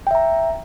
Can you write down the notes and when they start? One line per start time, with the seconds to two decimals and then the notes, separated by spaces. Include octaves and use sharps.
0.07 G5
0.11 E5
0.15 A#5